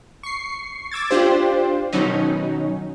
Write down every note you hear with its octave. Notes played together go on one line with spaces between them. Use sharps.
C#6 C7
D6 E6 G#6 A6
D4 F4 G4 C5
B2 D#3 F#3 C#4 D#4